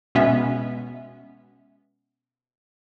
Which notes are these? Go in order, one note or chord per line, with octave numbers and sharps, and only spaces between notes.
B2 G#3 B3 C#4 E5